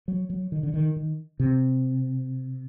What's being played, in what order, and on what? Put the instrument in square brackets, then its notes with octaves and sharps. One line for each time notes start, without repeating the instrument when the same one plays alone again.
[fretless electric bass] F#3
F#3
D#3
D3
D#3
D#3
C3